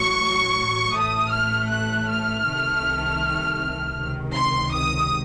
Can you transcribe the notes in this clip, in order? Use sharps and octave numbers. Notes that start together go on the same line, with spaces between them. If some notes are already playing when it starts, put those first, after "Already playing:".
Already playing: A1 A2 F#3 C#6
A1 A2 A3 D#6
F6
F#6
F6
C2 C3 D#3 A3
C#2 C3 D#3
C6
D#6